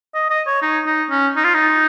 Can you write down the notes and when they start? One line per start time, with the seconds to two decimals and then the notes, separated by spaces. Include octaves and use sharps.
0.15 D#5
0.30 D#5
0.47 C#5
0.62 D#4
0.86 D#4
1.11 C#4
1.36 D#4
1.44 F4
1.54 D#4